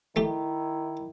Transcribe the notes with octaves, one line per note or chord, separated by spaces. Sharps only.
D#3 A3 E4 G4